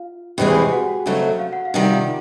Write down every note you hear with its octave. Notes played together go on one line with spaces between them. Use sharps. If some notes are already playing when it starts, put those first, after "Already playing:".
Already playing: F4 F5
E2 C3 E3 G#3 C4 G4 G5
G#4 G#5
G4 G5
F#4 F#5
F2 C#3 F#3 A3
F5
F#5
F5
C3 D#3 G3 F#5
F4 F5